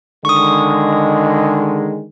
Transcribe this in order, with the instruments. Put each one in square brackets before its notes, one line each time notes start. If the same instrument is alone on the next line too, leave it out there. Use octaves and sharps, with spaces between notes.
[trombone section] D3 D#3 G#3 [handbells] C#6 D#6